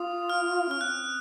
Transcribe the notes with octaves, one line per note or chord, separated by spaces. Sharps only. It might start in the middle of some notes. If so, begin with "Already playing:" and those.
Already playing: F4 D#6
F6
C#4 F6
C4 F#6